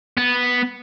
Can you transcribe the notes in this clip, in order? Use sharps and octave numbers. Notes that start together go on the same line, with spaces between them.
B3